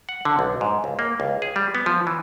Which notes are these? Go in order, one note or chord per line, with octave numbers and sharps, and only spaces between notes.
F#5
D3
B1
G#2
C#2
A#3
C#2
G#4
G3
B3
F3
E3